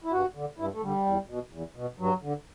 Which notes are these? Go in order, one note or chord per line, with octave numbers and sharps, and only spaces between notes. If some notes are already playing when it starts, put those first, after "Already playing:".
E4
G2 F#4
D3
G2 E4
A3
D3 G3
E2
B2
E2
B2
G2 F#3
D3